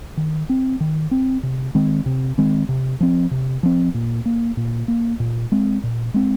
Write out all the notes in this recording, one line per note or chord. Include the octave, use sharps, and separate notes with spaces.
D#3
C4
D#3
C4
C3
D#3 G#3 C4
C3
D#3 G#3 C4
C3
F3 C4
C3
F3 C4
A#2
A#3
A#2
A#3
A#2
G#3 C4
A#2
G#3 C4